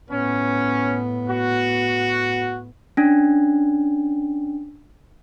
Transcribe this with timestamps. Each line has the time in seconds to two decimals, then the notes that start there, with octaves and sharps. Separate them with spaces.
0.10 A2 B3 C#4
1.30 F#4
2.97 C#4 D4